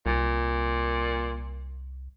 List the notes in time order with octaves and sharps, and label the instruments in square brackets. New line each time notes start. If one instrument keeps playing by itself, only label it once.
[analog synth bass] C2 [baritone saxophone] A#2